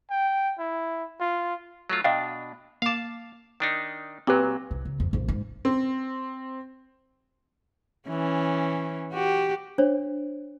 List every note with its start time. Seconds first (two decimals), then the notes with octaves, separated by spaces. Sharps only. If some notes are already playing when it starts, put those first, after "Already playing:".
0.10 G5
0.59 E4
1.20 F4
1.90 F#3 A3 F4
2.04 B2 D4 D#5 F5 G5
2.82 A#3 F5 A5 D6
3.60 D#3 D4 D#4
4.27 A#2 F#3 C4 G4 B4
4.71 C2
4.85 C#3
5.00 F2
5.13 A#1 F2
5.28 G#2
5.65 C4
8.09 E3 C#4
9.13 F#4 G4
9.78 D4 C5 C#5